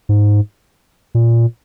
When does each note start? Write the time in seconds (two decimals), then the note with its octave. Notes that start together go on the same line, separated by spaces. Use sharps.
0.09 G#2
1.15 A#2